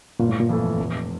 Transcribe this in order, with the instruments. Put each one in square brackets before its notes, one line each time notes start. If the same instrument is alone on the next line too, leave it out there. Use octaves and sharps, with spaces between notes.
[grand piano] G1 [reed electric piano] A#2
[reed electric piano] A2
A#2
[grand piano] F2 E3 A3
F1